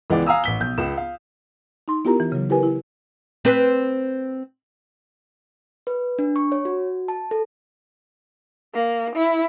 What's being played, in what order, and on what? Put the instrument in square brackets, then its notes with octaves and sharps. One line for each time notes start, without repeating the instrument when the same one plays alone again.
[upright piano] C#2 E3 G#3 B3 D5
F5 G#5 A#5 D#6 E6
A1 B6 G7
B1 G6
C#2 E7
F5
[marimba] D#4 C6
B3 E4 F4 G4 A#4 A#5
E3
C#3 F#3
E4 G4 A#4 B4 G#5
E4
[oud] C4 B4 C5
[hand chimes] B4
D4
C#6
C#5
F#4
A5
A4
[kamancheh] A#3
E4